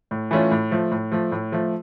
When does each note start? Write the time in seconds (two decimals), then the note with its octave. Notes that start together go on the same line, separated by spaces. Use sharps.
0.11 A2
0.31 E3 A3 C#4 F4
0.51 A2
0.71 F3 A3
0.91 A2
1.12 F3 A3
1.32 A2
1.52 F3 A3